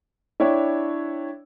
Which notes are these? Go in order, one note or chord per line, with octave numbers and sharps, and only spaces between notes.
D4 E4 C#5 G5